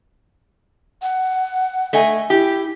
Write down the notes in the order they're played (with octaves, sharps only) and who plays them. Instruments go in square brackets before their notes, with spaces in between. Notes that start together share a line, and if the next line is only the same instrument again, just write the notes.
[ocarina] F#5
[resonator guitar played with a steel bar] A3 D#5 G#5
[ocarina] E4 [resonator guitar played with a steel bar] G4